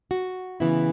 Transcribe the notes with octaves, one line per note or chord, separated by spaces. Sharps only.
F#4
C#3 E3 B3 E4